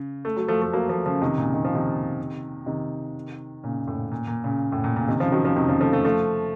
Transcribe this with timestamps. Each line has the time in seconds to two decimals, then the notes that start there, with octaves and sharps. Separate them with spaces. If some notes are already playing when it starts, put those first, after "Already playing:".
Already playing: C#3
0.25 A3
0.37 F#3
0.48 F3 A3
0.62 A3
0.73 F#3 A#3
0.89 F3 A3
1.06 C#3 F3
1.22 C3 D#3
1.38 A#2 C#3
1.54 D#3
1.65 F3
1.75 C3 D#3
2.66 C3 D#3
3.63 A#2 C#3
3.87 A2
4.11 A#2
4.27 A#2
4.44 A#2 C#3
4.72 A2
4.84 A#2
4.96 A#2 C#3
5.08 C3 D#3
5.20 C#3 F3
5.32 D#3 F#3
5.45 C#3 F3
5.56 C3 D#3
5.69 C#3 F3
5.81 F3 A3
5.92 F3 A3
6.05 F3 A3